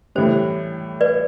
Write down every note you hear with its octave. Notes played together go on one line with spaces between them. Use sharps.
A2 E3 G3 C5
B4 D5